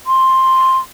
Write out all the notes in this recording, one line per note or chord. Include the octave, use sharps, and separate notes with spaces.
C6